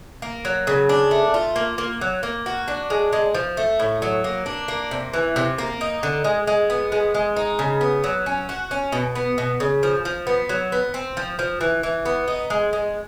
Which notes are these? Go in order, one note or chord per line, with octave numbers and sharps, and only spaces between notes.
A#3
F#3
C#3
D4
A3
F4
A#3
A#3
F#3
A#3
F#4
D4
G#3
G#3
F3
A3
A2
F#3
A#3
D4
A#3
C3
E3
C3
A#3
D#4
D3
G#3
G#3
B3
G#3
G#3
D#4
C#3
B3
F#3
C#4
F#4
C#4
B2
B3
B2
C#3
F3
F3
B3
F#3
B3
C4
F3
F3
E3
E3
B3
D#4
G#3
G#3